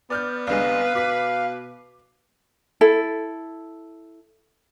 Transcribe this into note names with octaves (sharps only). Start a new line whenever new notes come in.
B3 D5 F6 G6
C2 D3 G#3 B4 F5
B2 D6 B6
E4 A4